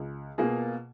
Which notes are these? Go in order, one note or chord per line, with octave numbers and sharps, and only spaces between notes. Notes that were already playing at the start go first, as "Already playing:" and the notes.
Already playing: C#2
B2 A#3 F4 G#4